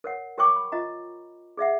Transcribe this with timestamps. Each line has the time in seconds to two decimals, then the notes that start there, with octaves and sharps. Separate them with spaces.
0.04 A#4 C#5 F#5
0.38 G4 A#4 C#5 G5 C#6 D6
0.56 B5
0.72 F4 D#5 A#5
1.57 G#4 D5 E5 F#5